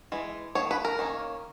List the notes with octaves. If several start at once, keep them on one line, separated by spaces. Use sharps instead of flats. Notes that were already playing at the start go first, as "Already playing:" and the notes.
E3 G#3
D#3 A#3 C#5
B4
A#4
D#3 A#3 C#4